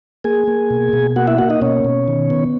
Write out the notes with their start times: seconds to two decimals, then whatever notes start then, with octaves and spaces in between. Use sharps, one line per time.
0.24 A#3 G#4 G#5
0.48 A#3
0.70 B2
0.93 B2
1.16 A#3 F#4 F#5
1.27 E4 E5
1.38 A#3 F#4 F#5
1.50 D#4 D#5
1.61 B2 C#4 C#5
1.85 B2
2.08 D#3
2.30 B3